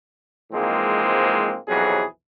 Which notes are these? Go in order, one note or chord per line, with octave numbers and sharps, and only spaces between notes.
G#2 E3 F3 G#3 A#3 C4
B1 F2 C3 E3 F#3 G#4